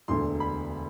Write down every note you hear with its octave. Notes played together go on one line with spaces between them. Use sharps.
E1 D2 D3 C6
B5